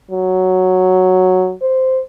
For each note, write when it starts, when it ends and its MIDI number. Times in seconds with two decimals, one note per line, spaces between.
0.11 1.52 54
1.62 2.01 72